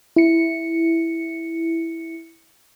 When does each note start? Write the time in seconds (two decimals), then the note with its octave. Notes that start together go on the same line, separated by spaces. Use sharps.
0.16 E4 C#7